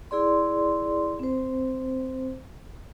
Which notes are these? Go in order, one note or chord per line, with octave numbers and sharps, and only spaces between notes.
E4 G#4 D5 C6
C4 C5